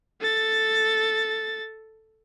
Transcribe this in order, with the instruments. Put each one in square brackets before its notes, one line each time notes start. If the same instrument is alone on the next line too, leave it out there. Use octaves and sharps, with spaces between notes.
[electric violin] A4 A6